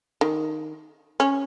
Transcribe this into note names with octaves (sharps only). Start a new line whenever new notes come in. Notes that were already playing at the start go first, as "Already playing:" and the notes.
D#3
C#4